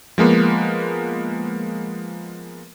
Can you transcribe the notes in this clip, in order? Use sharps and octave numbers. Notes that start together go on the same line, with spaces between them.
F3 G#3 A#3 B3